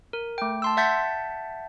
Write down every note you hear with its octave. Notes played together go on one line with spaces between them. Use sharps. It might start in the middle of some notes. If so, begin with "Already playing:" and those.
A#4
A3 G5
A5 C6 E6
E5 F#5 A5 G6 A6 B6